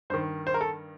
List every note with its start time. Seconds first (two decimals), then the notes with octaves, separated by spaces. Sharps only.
0.10 G2 C5
0.14 D#3
0.47 C5
0.54 A#4
0.61 A4